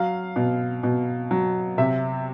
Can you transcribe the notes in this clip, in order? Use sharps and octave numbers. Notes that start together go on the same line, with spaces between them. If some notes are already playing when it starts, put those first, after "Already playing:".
Already playing: F#3 F5
B2
B2
F#3
C3 E5